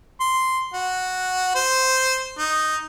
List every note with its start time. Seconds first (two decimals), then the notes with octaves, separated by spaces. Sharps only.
0.20 C6
0.74 F#4
1.55 C5
2.38 D#4